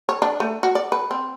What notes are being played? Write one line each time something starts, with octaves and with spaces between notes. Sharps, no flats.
C#5
D4
A3
F#4
D5
B4
C4